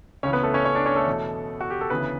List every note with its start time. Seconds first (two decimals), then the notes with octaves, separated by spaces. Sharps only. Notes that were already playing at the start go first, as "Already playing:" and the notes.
0.23 C#2 C#3 E3 C#4 C#5
0.33 B3 B4
0.43 A3 A4
0.54 C#4 C#5
0.65 C#4 C#5
0.75 D4 D5
0.86 C#4 C#5
0.96 A3 A4
1.06 E2 B2
1.61 F#4
1.70 G4
1.81 A4
1.90 D2 C#3 E3 B3 B4